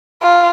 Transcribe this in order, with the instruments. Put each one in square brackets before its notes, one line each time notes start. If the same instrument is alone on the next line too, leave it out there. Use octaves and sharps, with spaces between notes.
[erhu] F4